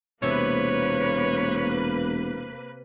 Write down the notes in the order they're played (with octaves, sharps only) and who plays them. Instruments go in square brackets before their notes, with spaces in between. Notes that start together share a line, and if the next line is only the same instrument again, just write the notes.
[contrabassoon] E1 [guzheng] C3 [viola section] A#3 B4 [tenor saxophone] C#5